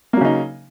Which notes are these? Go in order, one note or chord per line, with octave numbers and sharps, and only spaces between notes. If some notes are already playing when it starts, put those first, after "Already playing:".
C#3 F#3 A#3 D#4